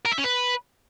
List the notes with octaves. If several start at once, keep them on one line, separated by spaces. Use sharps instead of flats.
A#4
E5
C#4
B4